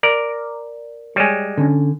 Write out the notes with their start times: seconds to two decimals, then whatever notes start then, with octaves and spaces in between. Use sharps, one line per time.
0.03 A#4 D5
1.16 G3 G#3 C#5 G#5
1.57 D3 C#4